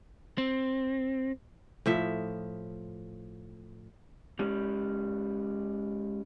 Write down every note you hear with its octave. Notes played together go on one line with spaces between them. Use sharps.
C4
A2 F3 E5
G#3 C#4 G4